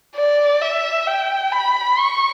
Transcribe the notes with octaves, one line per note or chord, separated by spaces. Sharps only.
D5
E5
G5
B5
C#6